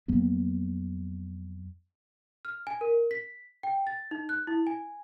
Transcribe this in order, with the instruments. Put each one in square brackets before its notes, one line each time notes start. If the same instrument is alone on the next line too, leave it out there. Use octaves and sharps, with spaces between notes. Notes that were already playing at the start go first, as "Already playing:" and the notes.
[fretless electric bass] F2 F#3 A#3 B3
[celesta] F6
G#5
A#4
B6
G5
A6
D#4
F#6
E4
G#5